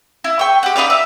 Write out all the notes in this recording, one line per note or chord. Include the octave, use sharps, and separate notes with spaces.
E4
G5 C#6
G4 F#5
D#4 B4 D5 F5
E5